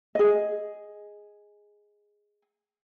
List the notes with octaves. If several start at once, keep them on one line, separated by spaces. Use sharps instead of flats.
G#4 D#5